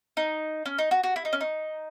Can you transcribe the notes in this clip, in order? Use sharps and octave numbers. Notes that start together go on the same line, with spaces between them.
D#4
C#4
D#4
F#4
F#4
E4
D#4
C#4
D#4